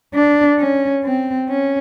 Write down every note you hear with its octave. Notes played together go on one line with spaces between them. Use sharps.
D4
C#4
C4
C#4